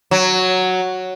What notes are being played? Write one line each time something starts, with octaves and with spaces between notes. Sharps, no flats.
F#3